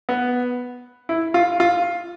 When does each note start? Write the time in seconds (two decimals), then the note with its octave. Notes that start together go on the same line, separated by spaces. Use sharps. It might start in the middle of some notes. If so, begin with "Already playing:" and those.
0.09 B3
1.09 E4
1.34 F4
1.60 F4